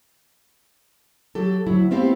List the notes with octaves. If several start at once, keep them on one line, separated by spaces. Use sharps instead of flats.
F#3 G4 A4
D2 F#3 E4
A3 B3 C4 E4 G4 F5